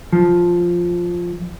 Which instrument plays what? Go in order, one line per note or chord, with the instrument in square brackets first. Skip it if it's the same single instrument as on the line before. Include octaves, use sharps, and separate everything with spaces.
[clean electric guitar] F3